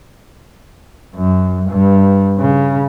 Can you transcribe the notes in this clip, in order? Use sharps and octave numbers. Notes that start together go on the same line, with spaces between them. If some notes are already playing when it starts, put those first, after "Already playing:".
F#2
G2
C#3